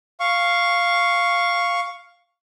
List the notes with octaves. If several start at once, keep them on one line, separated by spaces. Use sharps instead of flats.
F5 C#6